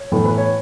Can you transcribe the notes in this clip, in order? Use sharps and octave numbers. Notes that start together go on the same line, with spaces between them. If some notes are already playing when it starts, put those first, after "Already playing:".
Already playing: C#5
A2 E3 B3 A4
B4
C#5